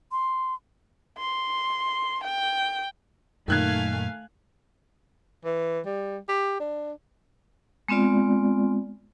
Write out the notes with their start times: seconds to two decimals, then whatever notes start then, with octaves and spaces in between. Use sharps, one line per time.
0.12 C6
1.18 C6
2.24 G5
3.48 F#2 A#2 D#3 A3 F5 G#5 F#6 G#6
5.45 E3
5.86 G3
6.29 G4
6.60 D4
7.88 G#3 B3 C4 F4 D5